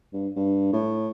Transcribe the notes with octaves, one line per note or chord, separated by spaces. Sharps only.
G2
G2
A2